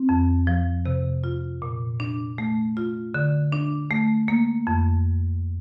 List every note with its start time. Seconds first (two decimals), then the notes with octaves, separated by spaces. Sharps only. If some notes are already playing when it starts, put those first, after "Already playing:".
Already playing: C4
0.09 F2
0.47 F3
0.86 C3
1.24 F4
1.62 A#2
2.00 D4
2.38 A3
2.77 F4
3.14 D3
3.52 D4
3.91 A3
4.28 A#3
4.67 F2